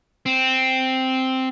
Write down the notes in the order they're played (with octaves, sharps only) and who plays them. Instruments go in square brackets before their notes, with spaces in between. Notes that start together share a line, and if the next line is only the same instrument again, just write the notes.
[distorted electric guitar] C4